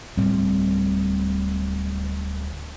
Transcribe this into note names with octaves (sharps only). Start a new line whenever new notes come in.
D1 A2 G3 C4